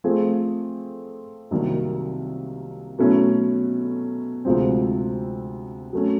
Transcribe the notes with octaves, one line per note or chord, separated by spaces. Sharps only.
F3 A3 C4 F4 G#4
C2 C3 D#3 F#3 A#3
B2 F#3 A3 C#4 E4
D2 C3 F3 G#3 C4
F#3 A3 C#4